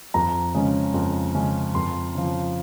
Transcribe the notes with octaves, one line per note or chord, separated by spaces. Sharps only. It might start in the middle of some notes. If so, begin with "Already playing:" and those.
F2 A#5
C#3 G#3 C#4
F2
C#3 G#3 C#4
F2 C6
C#3 F3